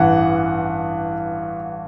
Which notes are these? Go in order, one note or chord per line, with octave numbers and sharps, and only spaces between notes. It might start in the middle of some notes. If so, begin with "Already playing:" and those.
Already playing: A1 G2 E3 F#5